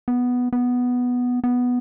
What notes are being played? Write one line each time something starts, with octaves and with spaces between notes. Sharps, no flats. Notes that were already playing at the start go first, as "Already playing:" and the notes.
B3
B3
B3